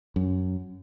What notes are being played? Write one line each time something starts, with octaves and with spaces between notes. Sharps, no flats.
F#2